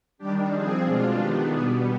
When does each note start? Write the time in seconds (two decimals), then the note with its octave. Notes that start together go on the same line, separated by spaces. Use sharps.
0.18 D#3 G3 D4 G4
0.51 F3 C4 G#4
0.84 B2 G#3 D4 F4
1.17 D#3 B3 D4 G4
1.50 B2 G3 B3 G#4